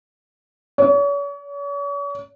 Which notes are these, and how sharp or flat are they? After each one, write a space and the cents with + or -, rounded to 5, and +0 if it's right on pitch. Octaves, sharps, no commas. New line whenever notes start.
C#5 +40